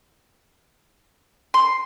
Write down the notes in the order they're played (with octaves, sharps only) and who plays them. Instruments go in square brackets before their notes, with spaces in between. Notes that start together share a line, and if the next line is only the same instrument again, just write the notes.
[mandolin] C6